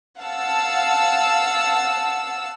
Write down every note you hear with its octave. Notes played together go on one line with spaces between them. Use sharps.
F5 F#5 A5 E6